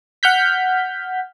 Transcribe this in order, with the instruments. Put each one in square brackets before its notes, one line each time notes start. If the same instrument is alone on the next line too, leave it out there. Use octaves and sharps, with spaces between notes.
[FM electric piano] F#5 F6 G6 B6